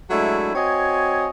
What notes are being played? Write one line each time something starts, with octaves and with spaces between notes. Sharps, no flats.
F#3 G#3 A3 D4 E4
C4 F#4 C#5 D#5 G#5